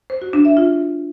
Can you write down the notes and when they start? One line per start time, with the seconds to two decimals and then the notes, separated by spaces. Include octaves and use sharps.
0.10 C5
0.22 F#4
0.33 D4
0.45 E5
0.57 F4